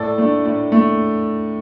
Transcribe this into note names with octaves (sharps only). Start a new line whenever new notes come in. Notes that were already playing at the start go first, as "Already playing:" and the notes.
Already playing: A2 A4 D5
A3 D4
A2
A3